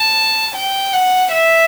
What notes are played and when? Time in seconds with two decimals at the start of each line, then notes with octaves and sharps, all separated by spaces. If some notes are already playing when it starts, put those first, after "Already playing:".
Already playing: A5
0.55 G5
0.93 F#5
1.31 E5